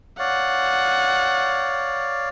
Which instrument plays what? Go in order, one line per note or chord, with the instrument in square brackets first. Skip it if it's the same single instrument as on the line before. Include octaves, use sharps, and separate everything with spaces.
[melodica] C#5 D5 F5 [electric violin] F#5